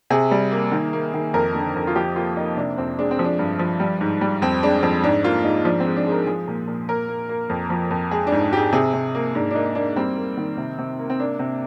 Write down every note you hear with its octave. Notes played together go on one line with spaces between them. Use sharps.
C3 G#4
G3
A#3
D#3
A#3
D#3
F2 A#4
D3
F2
F4
F3 G4
A#3 F4
A#3 D#4
C3 D4
F2 C4
G#3 D4
C4
F3
D4
G2
F3
G3
G#2
G3
F2 C4
G#3 D4
F2 C4
G#2 D4
A#3 F4
G#2 D#4
F3 D4
C4
G#3
D4
G#3
A#4
F3 G#4
A#2
A#2
A#3 A#4
A#3
A#3
F2
F3
F2
G#3 G#4
D4
G#2
G#2 G4 G#4
C3 G#4
C3
A#3
G#2 D4
D4
A#3 D#4
A#3 D4
G3 C4
A#3
D#3
C3
C3
A#3
C4
A#3 D4
C3